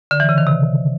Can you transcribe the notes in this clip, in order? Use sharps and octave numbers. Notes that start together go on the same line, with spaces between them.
D3
E3
C#3
D#3
C3